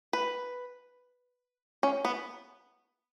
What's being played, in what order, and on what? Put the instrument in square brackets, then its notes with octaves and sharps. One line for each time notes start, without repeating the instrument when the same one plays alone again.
[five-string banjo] B4
C#4
B3